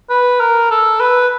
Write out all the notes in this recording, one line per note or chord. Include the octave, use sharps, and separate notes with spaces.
B4
A#4
A4
B4